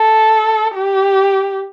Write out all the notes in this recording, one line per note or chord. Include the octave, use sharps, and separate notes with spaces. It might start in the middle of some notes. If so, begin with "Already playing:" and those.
Already playing: A4
G4